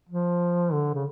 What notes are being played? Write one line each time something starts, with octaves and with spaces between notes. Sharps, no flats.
F3
D3
C#3